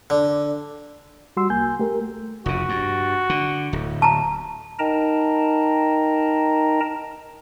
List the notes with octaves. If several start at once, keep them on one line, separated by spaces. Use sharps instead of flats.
D3
G3 F#4 C6 E6
C2 A#3 G#5 G6
A3 G4 A#4
F1 C#3 F#4
G2
D3
D1
A5 A#5
D#4 A#4 D#5 G5 A5 A#5